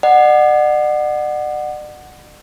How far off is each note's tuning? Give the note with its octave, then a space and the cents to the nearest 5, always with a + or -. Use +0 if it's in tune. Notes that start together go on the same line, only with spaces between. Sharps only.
D5 +40 F#5 +0